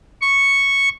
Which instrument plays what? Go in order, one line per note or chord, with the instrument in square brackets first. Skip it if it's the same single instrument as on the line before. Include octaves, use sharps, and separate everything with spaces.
[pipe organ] C#6